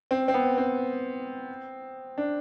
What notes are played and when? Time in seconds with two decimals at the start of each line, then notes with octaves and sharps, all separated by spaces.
0.11 C4
0.28 C4
0.34 B3
0.57 C4
2.18 D4